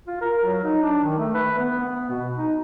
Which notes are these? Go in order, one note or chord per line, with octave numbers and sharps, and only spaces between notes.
F4
A#4
F#3
D#4
D4
D#3
A3
B4
B3
B3
B2
D#4